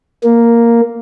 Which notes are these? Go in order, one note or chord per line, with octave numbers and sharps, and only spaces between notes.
A#3